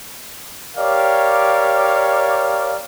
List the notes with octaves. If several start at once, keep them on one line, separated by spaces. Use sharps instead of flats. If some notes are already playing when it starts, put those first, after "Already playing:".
G4 A#4 C#5 D5 F5